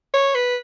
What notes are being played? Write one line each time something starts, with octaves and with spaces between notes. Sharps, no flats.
C#5
B4